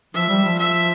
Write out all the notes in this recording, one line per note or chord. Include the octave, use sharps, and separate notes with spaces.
F3 E5
G3
F3
E5